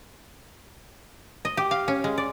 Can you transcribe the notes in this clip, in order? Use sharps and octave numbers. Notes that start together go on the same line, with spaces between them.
D#5
G4
F5
C#4
G#3
D5